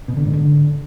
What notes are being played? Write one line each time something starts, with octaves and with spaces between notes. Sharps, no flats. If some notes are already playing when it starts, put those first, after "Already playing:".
B2
D3
G#2
D3